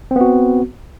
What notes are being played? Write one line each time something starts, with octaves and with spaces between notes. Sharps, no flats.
B3 C4 F#4